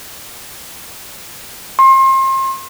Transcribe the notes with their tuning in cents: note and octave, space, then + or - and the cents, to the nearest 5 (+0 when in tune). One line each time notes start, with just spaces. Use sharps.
C6 +35